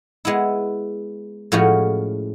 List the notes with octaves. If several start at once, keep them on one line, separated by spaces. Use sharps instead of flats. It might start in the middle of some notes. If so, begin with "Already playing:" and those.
G#3 B3 E4
A2 F3 G#3 C#4 F#4